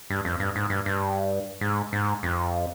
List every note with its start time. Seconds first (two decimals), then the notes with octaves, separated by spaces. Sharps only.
0.10 G2
0.25 F2
0.40 G2
0.56 G#2
0.70 G2
0.86 G2
1.61 G#2
1.93 G#2
2.23 F2